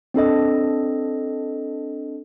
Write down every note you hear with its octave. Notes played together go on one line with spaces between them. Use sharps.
C4 D4 A4 D#5